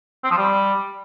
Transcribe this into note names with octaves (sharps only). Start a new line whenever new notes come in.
C4
F3
G3